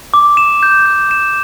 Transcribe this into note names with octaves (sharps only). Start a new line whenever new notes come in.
D6
E7
G6
G6
E7